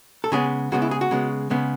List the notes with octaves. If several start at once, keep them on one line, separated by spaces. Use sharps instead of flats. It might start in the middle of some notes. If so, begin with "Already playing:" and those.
A4
C#3 G#3 B3 G#4
C#3 G#3 B3 F#4
E4
G#4
F#4
C#3 G#3 B3
C#3 G#3 B3